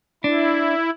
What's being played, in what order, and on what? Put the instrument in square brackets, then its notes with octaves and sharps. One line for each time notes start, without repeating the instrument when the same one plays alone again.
[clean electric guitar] D4 [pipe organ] E4